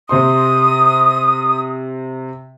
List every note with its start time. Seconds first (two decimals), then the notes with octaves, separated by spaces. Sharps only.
0.09 C3 C5 C6 D#6